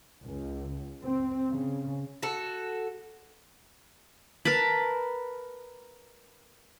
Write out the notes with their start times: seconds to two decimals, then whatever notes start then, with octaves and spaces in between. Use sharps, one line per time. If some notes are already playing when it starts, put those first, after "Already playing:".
0.23 C#2
1.04 C4
1.53 C#3
2.22 F#4 A4
4.45 A#4 B4 A5 B5